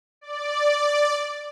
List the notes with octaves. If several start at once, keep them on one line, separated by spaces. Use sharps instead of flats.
D5